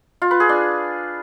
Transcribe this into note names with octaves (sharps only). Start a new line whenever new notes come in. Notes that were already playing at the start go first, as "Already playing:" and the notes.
F4
B4
G#4
D4